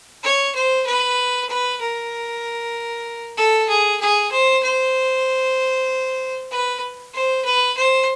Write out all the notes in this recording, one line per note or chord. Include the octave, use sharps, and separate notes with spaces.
C#5
C5
B4
B4
A#4
A4
G#4
G#4
C5
C5
B4
C5
B4
C5